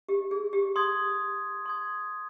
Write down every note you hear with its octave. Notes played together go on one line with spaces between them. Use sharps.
G4
G#4
G4
C6 D#6 G#6
C6 D#6 G#6